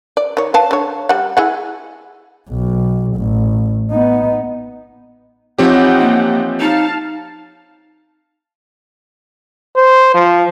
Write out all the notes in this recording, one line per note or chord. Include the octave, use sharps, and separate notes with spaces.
D5
D#3 C#5
B4 F5 A5
D3 C#5
G3 F#5
E4 G#4 F#5
B1
A1
B3 D#4
E3 F3 C4 D#4 G4 C#5 F#5 G5
A#3
D#4 F5 A5
C5
F3